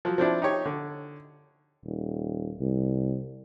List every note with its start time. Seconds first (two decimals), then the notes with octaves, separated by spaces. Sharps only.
0.05 F3 F#3
0.18 F3 C4 D4 E4
0.42 D#4 G4 C#5
0.65 D3
1.84 D#1
2.61 C2